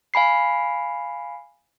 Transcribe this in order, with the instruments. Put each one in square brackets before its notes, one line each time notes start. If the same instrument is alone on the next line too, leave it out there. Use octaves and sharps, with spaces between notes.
[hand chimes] F5 G#5 B5 C7